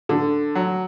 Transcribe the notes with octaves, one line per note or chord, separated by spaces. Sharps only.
D3
F#3